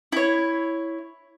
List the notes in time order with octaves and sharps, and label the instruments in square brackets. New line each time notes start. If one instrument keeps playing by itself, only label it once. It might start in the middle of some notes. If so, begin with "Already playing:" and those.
[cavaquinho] E4 C#5